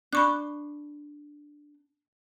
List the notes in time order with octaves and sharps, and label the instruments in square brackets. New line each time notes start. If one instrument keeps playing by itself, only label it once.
[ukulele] D4 [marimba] B5 C#6 F#6